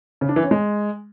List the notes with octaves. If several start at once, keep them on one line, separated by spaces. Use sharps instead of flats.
C#3
D4
E3
C#4
G#3